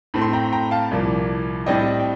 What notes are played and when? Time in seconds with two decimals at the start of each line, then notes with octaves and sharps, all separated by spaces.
0.14 A2 A3 C4
0.21 C6
0.33 G5 A#5
0.52 G5 A#5
0.71 F5 A5
0.91 C2 A#2 F3
1.66 A2 G3 C4 D#5 G5
2.00 G5